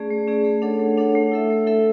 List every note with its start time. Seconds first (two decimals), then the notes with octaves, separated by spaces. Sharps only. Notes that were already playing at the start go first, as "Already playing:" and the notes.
Already playing: A3 C#4 G#4 D5
0.10 A3
0.27 C#4 G#4 D5
0.45 A3
0.62 D4 A4 C#5 F#5
0.80 A3
0.98 D4 A4 C#5 F#5
1.15 A3
1.31 E4 A4 E5
1.50 A3
1.67 E4 A4 E5